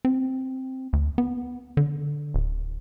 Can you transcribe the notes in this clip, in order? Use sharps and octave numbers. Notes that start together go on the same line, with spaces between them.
C4
D2
B3
D3
D1